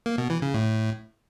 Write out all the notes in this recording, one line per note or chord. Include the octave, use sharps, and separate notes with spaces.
A#3
B2
E3
C#3
A2